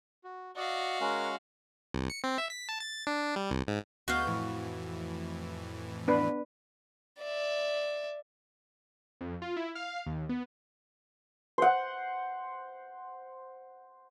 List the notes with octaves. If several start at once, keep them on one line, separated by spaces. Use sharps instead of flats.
F#4
F#4 D5 D#5 F5 F#5
G#3 C#4 A#4 F#5
C2
C#7
C4
E5
B6
A5
A6
D4
G3
C2
G#2
D2 B3 F#4 F5 G6
F2 A2 E3
B3 D4 B4
D5 E5
F2
F4
E4
F5
D#2
B3
C5 F#5